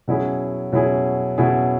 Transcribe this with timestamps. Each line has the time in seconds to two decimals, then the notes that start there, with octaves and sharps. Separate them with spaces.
0.08 B2 F#3 C#4 E4 G#4
0.72 B2 F#3 C#4 E4 G#4
1.38 B2 F#3 C#4 E4 G#4